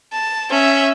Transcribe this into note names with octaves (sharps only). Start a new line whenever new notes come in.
A5
C#4 E5